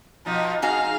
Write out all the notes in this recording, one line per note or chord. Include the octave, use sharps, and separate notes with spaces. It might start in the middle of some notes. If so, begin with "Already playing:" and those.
B2 F3 D#4
G#2 D#4 F#4 G#4 F5